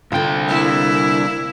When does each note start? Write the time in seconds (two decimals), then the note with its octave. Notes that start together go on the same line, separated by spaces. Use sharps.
0.12 C2 D3 F4 G5
0.48 A#3 E4